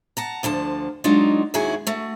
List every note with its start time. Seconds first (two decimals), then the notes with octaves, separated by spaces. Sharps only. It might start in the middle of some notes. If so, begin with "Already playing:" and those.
0.17 F#5 A5 A#5
0.43 D2 D3 F3 A5
1.04 F#3 G#3 D4 D#4 F4 F#4
1.54 D#2 D#3 E4 F#4 G#4 G#5
1.87 A3 F#4